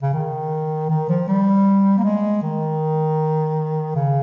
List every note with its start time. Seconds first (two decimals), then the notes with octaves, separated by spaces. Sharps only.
0.02 C#3
0.13 D#3
0.90 D#3
1.09 F3
1.28 G3
1.98 A#3
2.04 G#3
2.42 D#3
3.95 C#3